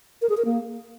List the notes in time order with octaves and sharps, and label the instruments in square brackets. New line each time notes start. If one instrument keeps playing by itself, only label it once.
[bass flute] A#4
G#4
A#4
A#3